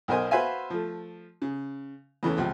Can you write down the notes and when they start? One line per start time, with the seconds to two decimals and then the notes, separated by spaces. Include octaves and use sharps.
0.08 B1 B2 A#4 C5 G#5 D#6
0.31 F#4 B4 C5 E5 F5 G#5
0.70 F3 A3
1.42 C#3
2.23 E2 E3 A3 C#4
2.37 C#2 C3 F3 C4